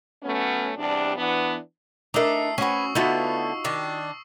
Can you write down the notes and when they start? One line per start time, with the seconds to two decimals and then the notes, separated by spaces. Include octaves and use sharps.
0.23 F#3 A3 B3 C#4
0.77 E2 C3 G3 D4
1.17 E3 B3 D4
2.14 A3 D4 D#4 A#4 A#5 D#6 E6 C7
2.58 C#4 F#4 B4 G#5 C#6
2.95 D3 A3 B3 D#4 F4 F#4 E6
3.65 D#3 D4 C#6